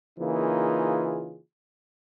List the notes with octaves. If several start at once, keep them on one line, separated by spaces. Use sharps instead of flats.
C#3 E3 A#3 D#4 F4 G#4